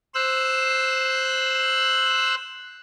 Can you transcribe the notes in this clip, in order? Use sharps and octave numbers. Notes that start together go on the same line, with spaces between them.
C5 E6 F#6